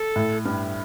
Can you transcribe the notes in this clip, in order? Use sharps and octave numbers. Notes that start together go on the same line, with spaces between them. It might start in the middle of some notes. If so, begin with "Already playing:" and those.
Already playing: A4
A2
G2